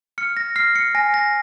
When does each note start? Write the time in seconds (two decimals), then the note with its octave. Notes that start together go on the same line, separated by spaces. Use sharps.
0.18 F6 C#7
0.37 A#6
0.56 F6 C7
0.76 C#7
0.95 G#5 A#6
1.14 A#6